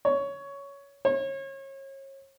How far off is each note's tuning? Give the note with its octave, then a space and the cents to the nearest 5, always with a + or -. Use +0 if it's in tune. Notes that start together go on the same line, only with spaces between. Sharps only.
C#5 +10
C#5 -35